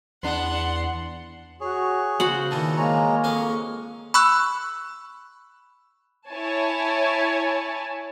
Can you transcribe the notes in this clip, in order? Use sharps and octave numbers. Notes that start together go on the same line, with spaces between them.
E2 B3 D4 F#5 C6
F#4 G#4 C#5
C#3 F#4 C5 F#5
A#2 D#3 E3 A5
G#3 A#3 C#5 A#5
F2 G#3 F5 C#6
B5 C#6 E6 F#6
E4 C#5 G#5 A5